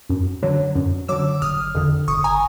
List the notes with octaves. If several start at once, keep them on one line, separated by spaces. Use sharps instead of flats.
F#2
D3 F#3
F#2
D3 F#3 D6 E6
G1 D#6 F6
F2 D3
G1 C#6 D#6
G#5 A#5